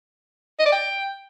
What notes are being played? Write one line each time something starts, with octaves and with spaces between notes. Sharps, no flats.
D#5
D5
G5